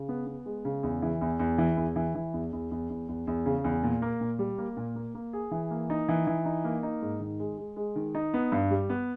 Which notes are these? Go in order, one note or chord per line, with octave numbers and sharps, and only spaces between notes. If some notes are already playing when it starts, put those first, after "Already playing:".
Already playing: C#3
B3
B3
G#3
C#3
E2
E3
E2
E2
E3
E2
E3
E3
E2
E2
E2
E2
E2
E2
C#3
E2
A#2
A#3
A#2
G3
A#3
A#2
A#3
A#3
G#4
E3
A#3
D#4
E3
E3
D#4
A#3
D#4
G#2
D#3
G#3
G#3
G#3
D#3
D#4
B3
G2
G3
B3